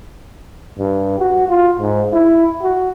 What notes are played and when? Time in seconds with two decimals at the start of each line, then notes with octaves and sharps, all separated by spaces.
0.79 G2
1.19 F#4
1.49 F4
1.80 G#2
2.13 E4
2.62 F#4